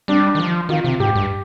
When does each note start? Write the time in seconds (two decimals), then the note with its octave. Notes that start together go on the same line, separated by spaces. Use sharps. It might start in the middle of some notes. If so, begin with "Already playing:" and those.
0.08 G3 D4
0.35 D#3
0.40 F3
0.69 D#3 F4
0.84 C3
1.00 G#2 G4
1.16 G2